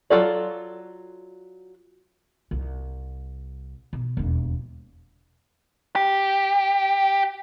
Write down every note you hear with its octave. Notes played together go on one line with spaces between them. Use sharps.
F#3 C4 F4 A4 D5
C2
B2
E1 D#2
G4